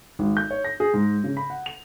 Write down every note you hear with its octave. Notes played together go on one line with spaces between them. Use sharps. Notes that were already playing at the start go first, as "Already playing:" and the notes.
G#1
G6
C#5
A#6
G#4
G#2
C#3
B5
F#5
F7